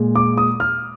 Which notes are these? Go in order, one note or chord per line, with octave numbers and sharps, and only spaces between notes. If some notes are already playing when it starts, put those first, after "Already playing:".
Already playing: A#2 G#3
D6
D#6
F6